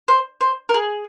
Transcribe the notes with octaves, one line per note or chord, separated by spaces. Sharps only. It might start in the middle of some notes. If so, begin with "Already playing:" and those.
C5
C5
A#4
G#4